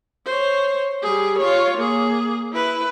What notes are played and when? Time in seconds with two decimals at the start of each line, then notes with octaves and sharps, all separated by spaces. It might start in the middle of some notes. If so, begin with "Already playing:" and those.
0.26 C5 C#5
1.02 G3 G#4
1.38 F4 C#5
1.77 A#3 G#4
2.52 E4 B4